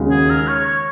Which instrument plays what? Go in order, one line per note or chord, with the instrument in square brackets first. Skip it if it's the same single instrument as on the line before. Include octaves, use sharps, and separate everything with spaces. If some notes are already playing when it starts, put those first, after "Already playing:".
Already playing: [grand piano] D#2 C#3 G#3 F#4
[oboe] G#4
A#4
C#5
C#5